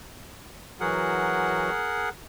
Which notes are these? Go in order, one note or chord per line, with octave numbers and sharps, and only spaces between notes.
E3 F#3 F#4 G#4 A#4 F#5